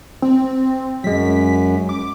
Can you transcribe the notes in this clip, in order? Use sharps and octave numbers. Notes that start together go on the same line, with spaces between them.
C4
F#2 F#3 G#3 B6
D6